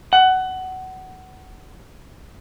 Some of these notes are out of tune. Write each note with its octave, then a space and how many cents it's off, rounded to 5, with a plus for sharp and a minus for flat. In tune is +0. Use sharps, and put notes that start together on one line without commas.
F#5 +15